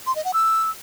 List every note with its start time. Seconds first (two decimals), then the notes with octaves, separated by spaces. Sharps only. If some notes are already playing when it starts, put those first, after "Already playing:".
0.07 C6
0.16 D#5
0.25 F#5
0.34 E6